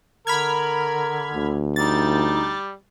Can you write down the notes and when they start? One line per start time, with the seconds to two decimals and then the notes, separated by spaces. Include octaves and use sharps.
0.27 D3 A#4 B5 F6 G#6
1.34 D2
1.76 G3 D#4 A6